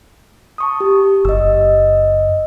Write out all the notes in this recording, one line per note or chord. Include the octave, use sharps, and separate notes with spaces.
A5 C#6 D#6
G4
F#1 D#5 E6